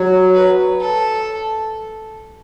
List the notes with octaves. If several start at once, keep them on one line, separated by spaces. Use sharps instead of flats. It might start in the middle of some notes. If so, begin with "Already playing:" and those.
Already playing: F#3
B4
A4